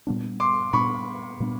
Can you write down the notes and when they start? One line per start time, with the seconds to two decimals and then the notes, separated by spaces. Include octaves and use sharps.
0.07 A#2 G3 B3 D4
0.40 C6 D6
0.73 A#2 G3 B3 D4 B5 C#6
1.40 A#2 G3 B3 D4